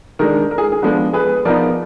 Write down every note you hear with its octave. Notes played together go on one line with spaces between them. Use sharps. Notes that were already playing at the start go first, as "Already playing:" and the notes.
D#3 G#3 D4 A#4
A#4
G#4
G#4
F3 G#3 B3 D4
G#4 B4
F3 B3 D#4 A#4 D5